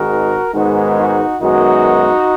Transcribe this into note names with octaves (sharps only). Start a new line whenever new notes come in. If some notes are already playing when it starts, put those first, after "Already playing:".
Already playing: G#1 G#2 D#3 G#3 F#4 A#4
G#2 D#3 G#3 B3 D#4 F#4
D#4 F#4
F#2 D#3 G#3 B3 D#4 F#4